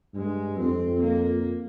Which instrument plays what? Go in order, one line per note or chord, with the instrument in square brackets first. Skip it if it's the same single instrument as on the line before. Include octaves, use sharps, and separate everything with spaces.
[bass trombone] G2 [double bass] G#3
[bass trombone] F2 [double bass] C4
[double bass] A#3